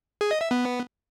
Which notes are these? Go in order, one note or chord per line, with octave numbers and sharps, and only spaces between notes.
G#4
D#5
E5
B3